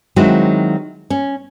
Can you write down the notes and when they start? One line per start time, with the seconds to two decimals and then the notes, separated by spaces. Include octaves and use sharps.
0.16 D#3 F#3 G#3 C4 E4 F#4
1.10 C#4